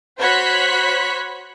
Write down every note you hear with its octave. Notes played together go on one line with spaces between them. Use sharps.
F#4 C5 C#5 B5 F#6 B6